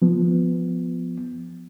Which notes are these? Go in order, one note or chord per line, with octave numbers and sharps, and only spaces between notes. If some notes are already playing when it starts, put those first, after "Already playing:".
F3 B3